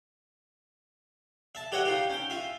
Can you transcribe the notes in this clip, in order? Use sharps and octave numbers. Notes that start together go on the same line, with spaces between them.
E5 A5
G4 B4 C#5 D#5 E5 F#5
D#4 F4 G4
C#4 G5
F4 E5